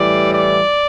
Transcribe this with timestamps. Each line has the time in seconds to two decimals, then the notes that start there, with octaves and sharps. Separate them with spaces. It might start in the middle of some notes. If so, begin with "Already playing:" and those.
Already playing: A2 E3 G3 D5
0.31 D5